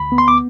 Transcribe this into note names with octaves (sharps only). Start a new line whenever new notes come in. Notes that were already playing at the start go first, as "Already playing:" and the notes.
Already playing: D2 B5
B3
C6
D6